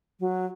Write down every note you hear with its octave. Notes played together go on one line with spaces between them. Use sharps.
F#3